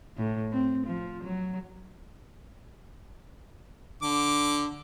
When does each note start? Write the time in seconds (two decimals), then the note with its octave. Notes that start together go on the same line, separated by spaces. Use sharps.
0.17 A2
0.52 C4
0.87 F3
1.23 F#3
4.02 D3 D6